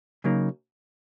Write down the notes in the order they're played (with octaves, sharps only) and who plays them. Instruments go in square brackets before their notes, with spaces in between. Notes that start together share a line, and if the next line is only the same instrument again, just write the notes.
[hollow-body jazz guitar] C#3 F#3 A#3 D#4